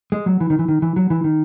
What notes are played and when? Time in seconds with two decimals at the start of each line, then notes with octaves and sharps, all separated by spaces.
0.12 G#3
0.26 F#3
0.40 E3
0.50 D#3
0.59 E3
0.68 D#3
0.82 E3
0.96 F#3
1.10 E3
1.24 D#3